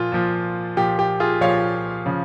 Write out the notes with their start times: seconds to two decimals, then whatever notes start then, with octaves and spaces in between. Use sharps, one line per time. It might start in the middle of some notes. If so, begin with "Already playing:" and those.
Already playing: A#2 F3 F4
0.12 A#2 F3
0.77 A#2 F3 G4
0.99 G4
1.20 F4 G#4
1.41 A#2 F3 C#5 F5
2.06 C#3 F3